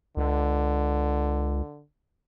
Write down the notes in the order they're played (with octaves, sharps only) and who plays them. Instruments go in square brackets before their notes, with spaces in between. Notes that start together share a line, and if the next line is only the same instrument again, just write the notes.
[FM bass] C#2 [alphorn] D3